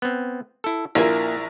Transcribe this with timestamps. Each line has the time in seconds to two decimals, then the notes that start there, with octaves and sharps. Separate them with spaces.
0.02 B3 C4
0.64 E4 A4
0.95 A#1 A#3 E4 F4 A#4 G#5